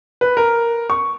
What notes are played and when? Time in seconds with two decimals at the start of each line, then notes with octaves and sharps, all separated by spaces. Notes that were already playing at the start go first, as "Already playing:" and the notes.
0.21 B4
0.37 A#4
0.90 C#6